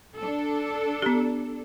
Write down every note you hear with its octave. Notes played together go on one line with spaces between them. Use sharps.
D4 A4
B3 G4